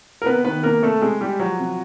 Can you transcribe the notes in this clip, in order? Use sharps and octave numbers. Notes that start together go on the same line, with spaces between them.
A#4
C3 B3 B4
D#3 B3 B4
C3 A#3 A#4
C3 A3 A4
C3 G#3 G#4
G3 G#3 G4
F3 F#3 F#4
C3